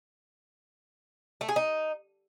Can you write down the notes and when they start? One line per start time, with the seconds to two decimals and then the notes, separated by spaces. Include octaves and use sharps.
1.41 A3
1.49 G#4
1.56 D#4